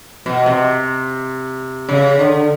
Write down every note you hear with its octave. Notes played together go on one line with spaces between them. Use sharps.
B2
C3
C#3
D3